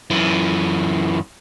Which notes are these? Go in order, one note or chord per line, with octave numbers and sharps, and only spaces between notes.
F#2 E3